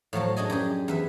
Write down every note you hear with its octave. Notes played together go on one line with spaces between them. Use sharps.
A2 F3 F#3 A5
D4 G#4 D#5 G#5
F#2 G4 G#4
E2 B4 E5